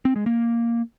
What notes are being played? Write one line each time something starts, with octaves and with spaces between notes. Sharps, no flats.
C4
G#3
A#3